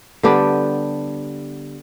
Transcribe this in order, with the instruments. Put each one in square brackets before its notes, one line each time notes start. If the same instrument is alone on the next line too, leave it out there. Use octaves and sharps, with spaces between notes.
[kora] D3 G3 B3 D4 G4